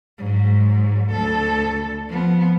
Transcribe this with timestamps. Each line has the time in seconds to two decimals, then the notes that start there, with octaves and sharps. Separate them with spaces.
0.19 G#2 F#3
1.11 D2 A4
2.09 F3 B3